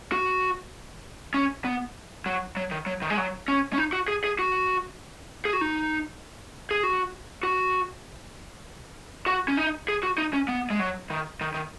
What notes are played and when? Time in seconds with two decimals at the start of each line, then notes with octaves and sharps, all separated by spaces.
0.12 F#4
1.34 C#4
1.65 B3
2.26 F#3
2.57 F#3
2.71 D#3
2.86 F#3
3.02 D#3
3.10 G#3
3.18 F#3
3.48 C#4
3.73 C#4
3.78 D#4
3.93 F#4
4.08 G#4
4.24 G#4
4.39 F#4
5.45 G#4
5.53 F#4
5.61 D#4
6.71 G#4
6.83 F#4
7.43 F#4
9.26 F#4
9.48 C#4
9.57 D#4
9.88 G#4
10.03 F#4
10.18 D#4
10.33 C#4
10.48 B3
10.70 G#3
10.80 F#3
11.10 D#3
11.41 D#3
11.54 D#3